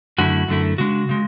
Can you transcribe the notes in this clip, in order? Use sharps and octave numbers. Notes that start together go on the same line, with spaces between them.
F#2 D3 A3 E4 F#4
F#2 D3 A3 E4
C#3 G#3 D4 F#4
C#3 G#3